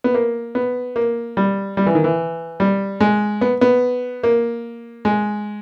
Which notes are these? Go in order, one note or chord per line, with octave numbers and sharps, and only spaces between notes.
B3
A#3
B3
A#3
G3
G3
E3
D#3
E3
G3
G#3
B3
B3
A#3
G#3